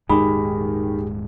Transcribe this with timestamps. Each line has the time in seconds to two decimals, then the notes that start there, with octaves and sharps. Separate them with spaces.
0.10 D#1 G#2 D#3 G#3 G4 G#4 B5